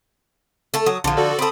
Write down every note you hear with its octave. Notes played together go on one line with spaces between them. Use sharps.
A3 A4
F#3 D#6
A#1 D3 F3
F#4 A4 D5
C4 A4 B5 D#6